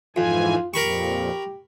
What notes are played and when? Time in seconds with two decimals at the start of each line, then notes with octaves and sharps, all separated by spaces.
0.16 F2 G#2 E3 F4 G#5
0.74 F2 A#2 G4 A#4 B5 C#6